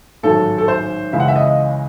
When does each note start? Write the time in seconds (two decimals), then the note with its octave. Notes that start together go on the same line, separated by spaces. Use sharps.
0.23 A1 G#2 D#3 F#3 A4
0.58 A4
0.68 C5
1.13 C#2 C#3 E3 G#3 E5
1.20 F#5
1.28 E5
1.36 D#5